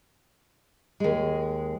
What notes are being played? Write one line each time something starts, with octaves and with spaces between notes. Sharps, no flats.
D#2 G#3